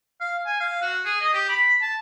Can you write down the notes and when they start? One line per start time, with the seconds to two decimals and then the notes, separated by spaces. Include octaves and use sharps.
0.21 F5
0.46 G#5
0.61 F5
0.82 F#4
1.05 G#4
1.21 D#5
1.34 G4
1.49 B5
1.82 A5